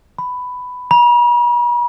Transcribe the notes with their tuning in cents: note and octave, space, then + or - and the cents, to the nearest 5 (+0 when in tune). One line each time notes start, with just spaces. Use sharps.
B5 +10
B5 -45